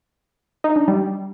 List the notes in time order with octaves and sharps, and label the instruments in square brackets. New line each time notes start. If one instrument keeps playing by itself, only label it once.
[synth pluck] D#4
D4
G3